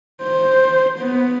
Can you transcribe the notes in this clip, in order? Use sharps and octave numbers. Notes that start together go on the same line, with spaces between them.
C5
B3